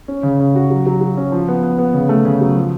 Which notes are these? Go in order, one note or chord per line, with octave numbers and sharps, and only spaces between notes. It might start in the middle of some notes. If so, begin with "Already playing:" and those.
C#4
C#3
C#3
F#4
F#3
F#3
F#3
C#4
F3
B3
B3
B3
C#3
A3
C#3
F#3
F3